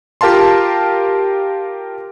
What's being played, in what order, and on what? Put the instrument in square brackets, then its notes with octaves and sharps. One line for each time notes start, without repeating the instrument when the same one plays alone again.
[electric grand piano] F4 G4 A#4 F5 A5 C6